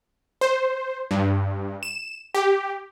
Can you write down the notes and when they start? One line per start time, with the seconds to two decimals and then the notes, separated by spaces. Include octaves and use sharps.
0.41 C5
1.11 G2
1.83 E7
2.34 G4